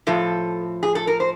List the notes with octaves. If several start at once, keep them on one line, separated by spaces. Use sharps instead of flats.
A2 F3 A4
G#4
A4
A#4
C5